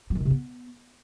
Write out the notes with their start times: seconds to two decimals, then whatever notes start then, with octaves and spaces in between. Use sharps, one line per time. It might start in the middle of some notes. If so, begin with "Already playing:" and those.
0.10 F#3
0.15 D#3
0.20 B2
0.25 C3
0.30 B3